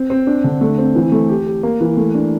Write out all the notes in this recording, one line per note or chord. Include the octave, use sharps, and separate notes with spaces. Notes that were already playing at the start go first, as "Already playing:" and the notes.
Already playing: C4
C4
D4
D3
A3
C4
E3
A3
G4
G4
A#3
E3
A3
D4